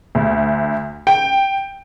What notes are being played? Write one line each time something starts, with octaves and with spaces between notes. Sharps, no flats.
D2
G5